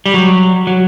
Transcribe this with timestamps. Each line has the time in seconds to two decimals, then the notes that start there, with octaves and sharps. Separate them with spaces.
0.06 G3
0.14 F#3
0.67 F#3